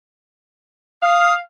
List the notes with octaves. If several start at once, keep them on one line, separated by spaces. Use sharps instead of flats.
F5 D#6